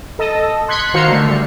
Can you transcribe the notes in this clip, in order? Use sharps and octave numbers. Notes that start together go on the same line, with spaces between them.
A4 D#5
C6 F#6 G#6 B6 C#7
D#3 F#4 A#4 C5 F5 C#7
D3 A3
G3